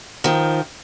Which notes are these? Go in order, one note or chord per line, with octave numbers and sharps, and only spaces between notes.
D#3 F3